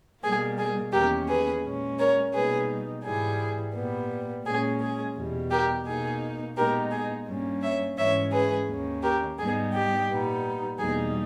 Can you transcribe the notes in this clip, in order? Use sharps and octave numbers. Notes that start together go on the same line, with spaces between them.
B2 G3 A#3 G#4
G#4
E2 D#3 A#3 C#4 G4 A#4
G#4 B4
A#2 G#3 C#4
A#4 C#5
B2 G3 A#3 D#4 G#4 B4
G#2 E3 G3 G#4
A#2 G3 B3
A#2 G#3 C#4 G#4
G#4
E2 B2 G3
G4 A#4
B2 A#3 D#4 G#4
A#2 G#3 B3 D#4 G4 A#4
G#4
G2 G3 A#3 C#4
C#5 E5
G#2 E3 G#3 C#4 C#5 E5
G#4 B4
D#2 D#3 A#3 C#4
G4 A#4
G#2 G3 B3 D#4 G#4
G4
A#2 G3 B3 D#4
E2 B2 G3 A#3 D#4 G#4